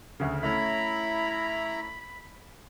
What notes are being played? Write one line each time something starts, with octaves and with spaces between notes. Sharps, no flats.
D2 C#3
A3 C#4 E4 A#5 B5